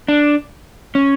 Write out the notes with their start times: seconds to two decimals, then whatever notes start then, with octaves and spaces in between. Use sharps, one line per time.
0.08 D4
0.95 C#4